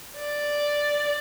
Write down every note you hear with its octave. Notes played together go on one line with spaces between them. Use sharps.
D5